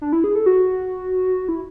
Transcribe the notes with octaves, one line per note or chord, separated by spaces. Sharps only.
D4
E4
G#4
A4
F#4
E4